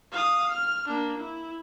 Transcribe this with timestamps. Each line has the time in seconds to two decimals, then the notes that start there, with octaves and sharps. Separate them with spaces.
0.12 F5 D#6
0.51 F6
0.88 A#3 D4
1.18 E4